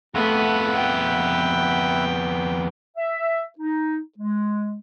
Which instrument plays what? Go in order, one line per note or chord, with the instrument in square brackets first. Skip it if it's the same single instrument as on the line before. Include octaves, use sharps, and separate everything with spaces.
[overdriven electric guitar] F2 B3 [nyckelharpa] A3 [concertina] E5 F#5 B5
[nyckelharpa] G5
[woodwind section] E5
D#4
G#3